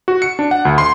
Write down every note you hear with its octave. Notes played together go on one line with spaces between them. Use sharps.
F#4
C#7
D4
F#5
D2
C6